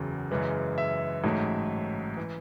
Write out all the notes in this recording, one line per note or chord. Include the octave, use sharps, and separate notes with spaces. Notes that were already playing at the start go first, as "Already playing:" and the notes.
Already playing: F#1 E2 C#3 F#3
F#2 C#3 E3 G#3
E5
A1 G#2 F#3 A3
E3